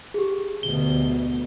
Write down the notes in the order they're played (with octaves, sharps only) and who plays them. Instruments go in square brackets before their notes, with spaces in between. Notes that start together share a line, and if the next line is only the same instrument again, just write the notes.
[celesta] G4 G#4
[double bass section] D2 B2 [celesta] G7